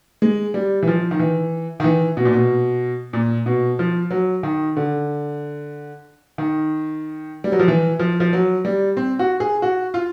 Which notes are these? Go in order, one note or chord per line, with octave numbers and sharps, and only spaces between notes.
G#3
G3
E3
F3
D#3
E3
D#3
E3
B2
A#2
B2
A#2
B2
F3
F#3
D#3
D3
D#3
G3
F#3
F3
E3
F3
F3
F#3
G3
C4
F#4
G#4
F#4
F4